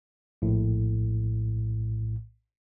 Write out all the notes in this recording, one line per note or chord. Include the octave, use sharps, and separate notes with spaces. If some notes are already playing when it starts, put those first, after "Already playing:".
A#1 A2